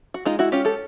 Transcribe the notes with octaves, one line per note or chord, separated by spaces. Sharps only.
F#4
G#3 D#4 F4
E4 F#4
C#4 F4 G4
G4 A4